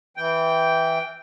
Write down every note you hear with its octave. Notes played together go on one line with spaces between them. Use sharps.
E3 G5